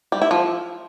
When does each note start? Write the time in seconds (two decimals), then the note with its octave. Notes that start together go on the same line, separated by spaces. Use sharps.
0.12 G3
0.22 E4
0.31 F3